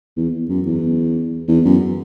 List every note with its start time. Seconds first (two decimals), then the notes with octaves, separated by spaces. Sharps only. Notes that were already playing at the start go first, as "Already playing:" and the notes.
0.17 E2
0.49 F#2
0.66 E2
1.48 E2
1.65 F#2